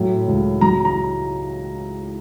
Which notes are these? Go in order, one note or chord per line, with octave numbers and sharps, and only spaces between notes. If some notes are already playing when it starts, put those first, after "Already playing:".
Already playing: A2 F#3
C#2
F#3 A#5
A#5